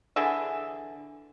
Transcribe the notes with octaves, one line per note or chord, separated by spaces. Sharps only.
D3 E3 G#4 E5